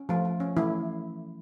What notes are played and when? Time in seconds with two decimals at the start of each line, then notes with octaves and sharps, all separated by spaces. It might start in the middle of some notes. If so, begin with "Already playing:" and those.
Already playing: C#4
0.09 F3 A3 F4
0.25 F3
0.40 C#4
0.56 E3 A3 E4